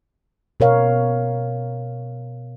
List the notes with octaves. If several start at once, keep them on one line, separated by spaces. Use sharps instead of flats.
B2 A#4 C#5 F5